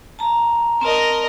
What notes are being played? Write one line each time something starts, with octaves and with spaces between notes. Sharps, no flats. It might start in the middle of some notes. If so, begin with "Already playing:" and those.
A5 A#5
C4 A#4 D#5 A5